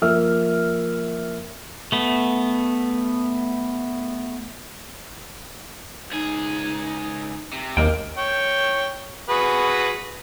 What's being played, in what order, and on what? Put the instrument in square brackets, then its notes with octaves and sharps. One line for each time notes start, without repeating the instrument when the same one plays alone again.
[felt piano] F3 A#3 E5 E6 F6
[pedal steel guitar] A3 B3
[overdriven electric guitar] C#2 G#4 [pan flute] D#4
[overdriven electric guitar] C3
[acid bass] D#2 [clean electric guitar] G#3 A#3 G5 [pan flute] A#4
[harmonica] C#5 G5
F#4 G#4 B4